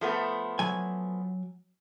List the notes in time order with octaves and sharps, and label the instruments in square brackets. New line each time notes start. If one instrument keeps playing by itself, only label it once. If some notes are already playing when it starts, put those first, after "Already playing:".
[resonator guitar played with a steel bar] F3 A3 B3
[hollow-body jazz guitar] F#3 G#5